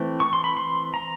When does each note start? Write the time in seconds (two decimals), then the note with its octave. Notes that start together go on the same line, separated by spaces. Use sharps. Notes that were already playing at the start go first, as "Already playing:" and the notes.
Already playing: E3 A3 C4
0.20 C#6
0.33 C6
0.44 B5
0.57 C6
0.94 A#5